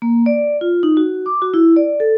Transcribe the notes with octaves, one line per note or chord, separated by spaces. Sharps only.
A#3
D5
F4
D#4
F#4
D6
F#4
E4
D5
A4